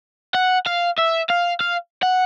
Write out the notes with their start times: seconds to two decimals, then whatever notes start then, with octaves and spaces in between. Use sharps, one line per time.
0.35 F#5
0.66 F5
0.98 E5
1.30 F5
1.60 F5
2.03 F#5